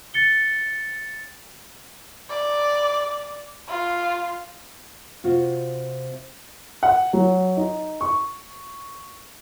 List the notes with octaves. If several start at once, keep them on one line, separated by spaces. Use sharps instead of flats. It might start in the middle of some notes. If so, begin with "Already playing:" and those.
A6 C#7 G7
D5
F4
C3 F4 F#4
F#5
F#3
D#4
C#6